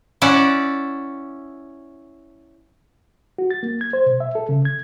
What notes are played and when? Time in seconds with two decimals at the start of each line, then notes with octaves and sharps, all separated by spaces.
0.22 C#4 E4 D5 F#5
3.38 F#4
3.51 A6
3.63 A#3
3.81 G#6
3.93 C5
4.06 B2
4.20 E5
4.35 A4
4.49 C#3
4.65 G#6